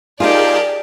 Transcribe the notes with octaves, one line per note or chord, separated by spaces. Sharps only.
D#4 F4 G4 G#4 A#4 D5 A5